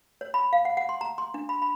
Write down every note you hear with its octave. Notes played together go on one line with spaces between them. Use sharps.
C#5
B5
F5
F#5
F#5
C6
A#5
C6
D4
B5
B5